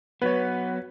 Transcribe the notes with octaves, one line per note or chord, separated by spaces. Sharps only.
F#3 B3 B4 C#5